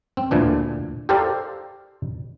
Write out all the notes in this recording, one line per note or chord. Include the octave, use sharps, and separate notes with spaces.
C4
D2 A#2 E3 D4
G4 A4 A#4 C5 D5 F5